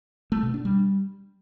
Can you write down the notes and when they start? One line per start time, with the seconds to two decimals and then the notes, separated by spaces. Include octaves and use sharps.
0.32 A3
0.43 B2
0.54 D4
0.65 G3